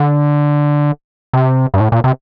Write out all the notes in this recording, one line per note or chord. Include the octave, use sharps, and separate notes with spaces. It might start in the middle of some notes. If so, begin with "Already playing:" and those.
Already playing: D3
C3
G2
A2
A#2
C3